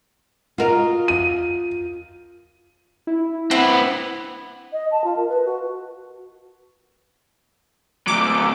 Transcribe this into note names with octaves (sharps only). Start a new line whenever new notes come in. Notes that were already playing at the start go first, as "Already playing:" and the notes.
F4 F#4 A#4 D#5 F5
D#7
E4
C4 E4 B4 F#5
D#5
A5
F4
A#4
B4
F#4
F#3 A3 D6